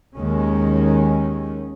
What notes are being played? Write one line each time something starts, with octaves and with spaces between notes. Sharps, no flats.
D#2 D#3 G#3 C#4